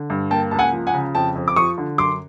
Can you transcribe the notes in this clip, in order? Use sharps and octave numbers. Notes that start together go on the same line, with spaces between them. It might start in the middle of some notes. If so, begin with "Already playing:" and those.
Already playing: D3
G2
A#3 G5 A5
C#2 A5
F#5 G#5
F3
F#5 G#5
C#3
F2 G5 A5
F2
D6
F3 C#6 D#6
D3
F#2 C6 D6